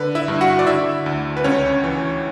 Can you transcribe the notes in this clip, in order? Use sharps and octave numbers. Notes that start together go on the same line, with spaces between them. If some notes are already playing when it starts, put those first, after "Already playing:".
Already playing: D3 B4
E4 E5
G2
F#4 F#5
D5
D3 E4 E5
D2
B4
C#2 C#4 C#5
E3